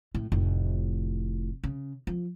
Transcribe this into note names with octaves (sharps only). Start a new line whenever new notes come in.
A2
F1 A2
C#3
F3